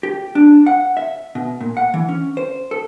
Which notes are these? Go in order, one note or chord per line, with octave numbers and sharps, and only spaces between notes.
G4
D4
F#5
E5
B2
A#2
F#5
E3
C#4
C5
A4